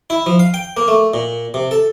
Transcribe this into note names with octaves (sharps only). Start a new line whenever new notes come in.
E4
F3
F5
G5
A#3
A3
A#2
C3
A4